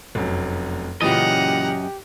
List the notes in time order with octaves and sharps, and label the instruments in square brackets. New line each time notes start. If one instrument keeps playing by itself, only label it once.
[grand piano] F1 F#2
[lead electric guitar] F#2 D#5 [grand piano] A#2 C#3 E3 [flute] G4 [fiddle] F#5 A#5